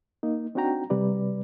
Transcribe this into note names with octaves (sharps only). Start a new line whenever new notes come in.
A#3 D#4
C4 D4 D#4 F#4 G5 A#5
C3 G3 B4 D5